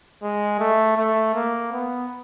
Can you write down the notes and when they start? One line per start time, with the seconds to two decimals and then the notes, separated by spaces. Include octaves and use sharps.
0.23 G#3
0.59 A3
0.97 A3
1.34 A#3
1.72 B3